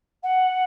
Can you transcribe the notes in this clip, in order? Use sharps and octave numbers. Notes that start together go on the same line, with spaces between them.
F#5